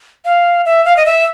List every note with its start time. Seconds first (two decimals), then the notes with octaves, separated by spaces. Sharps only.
0.25 F5
0.66 E5
0.85 F5
0.97 D#5
1.06 E5